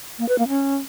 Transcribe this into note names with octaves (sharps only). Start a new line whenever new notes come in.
A#3
B4
A#3
C#4